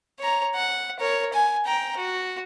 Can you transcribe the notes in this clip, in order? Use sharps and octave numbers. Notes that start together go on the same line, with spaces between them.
C#5 A#5
F#5
A#4 C#5
G#5
G5 A#5
F#4